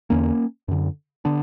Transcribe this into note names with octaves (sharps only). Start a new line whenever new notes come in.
E2 D3 A#3 C#4
F#2 D3
D3 B3 D4